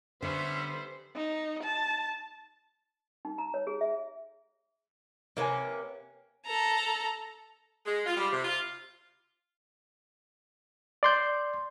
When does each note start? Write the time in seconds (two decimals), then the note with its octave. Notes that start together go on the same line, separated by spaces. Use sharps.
0.22 D3 G3 B3 C#4 C5 E5
1.16 D#4
1.64 A5
3.25 D#4
3.38 A#5
3.54 C#5
3.67 G#4
3.81 E5
5.37 C3 A#3 C#4 A#4 B4 G#5
6.46 A4 A#5
7.85 G#3
8.05 F4
8.17 G3
8.32 C3
8.44 F4
11.03 D5 C6 G6